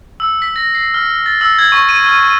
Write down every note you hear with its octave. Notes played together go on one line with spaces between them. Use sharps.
E6
B6
A#6
C7
F6
A6
E6
G#6
C#6
D#7
F6
D#7